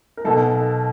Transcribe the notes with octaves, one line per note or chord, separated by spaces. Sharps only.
A#4
B1 B2 A4